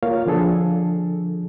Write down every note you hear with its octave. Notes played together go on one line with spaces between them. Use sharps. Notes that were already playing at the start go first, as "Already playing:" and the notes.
A#3 F4 A#4 C#5 F5
D3 F3 D4 G#4 A4